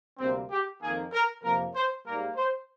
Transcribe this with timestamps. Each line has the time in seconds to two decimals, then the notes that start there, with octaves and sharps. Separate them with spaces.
0.19 D2 C3 G3 A#3 C4
0.51 G4
0.81 F2 D#3 A#3 G#4
1.13 A#4
1.43 F2 C3 F3 A#3 A#4
1.75 C5
2.06 G#2 G3 A#3 A#4
2.36 C5